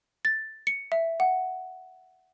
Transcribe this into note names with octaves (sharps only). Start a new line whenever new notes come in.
A6
C#7
E5
F#5